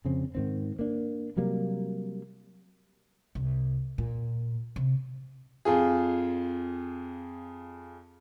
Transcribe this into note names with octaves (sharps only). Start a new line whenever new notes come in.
F2 C#3 C4
G#2 D#3 C4
A#3 D4
C3 F#3 G3 A#3
C2
A#2
C3
F2 F4 G#4